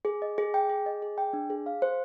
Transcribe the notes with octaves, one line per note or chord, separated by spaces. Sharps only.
G#4
D#5
G#4
G5
G#4
D#5
G#4
G5
D4
G#4
F5
C5